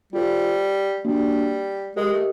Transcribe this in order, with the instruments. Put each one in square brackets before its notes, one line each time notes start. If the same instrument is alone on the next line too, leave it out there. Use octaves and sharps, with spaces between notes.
[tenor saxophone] G3 [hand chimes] F4 A4 C5
[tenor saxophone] G3 [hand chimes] A#3 D4 F#4
[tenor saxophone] G#3 [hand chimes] G4 A#4 D#5
[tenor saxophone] A3